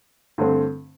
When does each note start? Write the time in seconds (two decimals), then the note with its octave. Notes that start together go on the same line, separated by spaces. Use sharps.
0.38 G2 D3 A3 C4